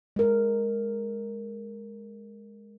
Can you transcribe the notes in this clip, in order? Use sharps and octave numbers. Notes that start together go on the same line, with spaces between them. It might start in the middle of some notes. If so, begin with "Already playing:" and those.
G#3 A#4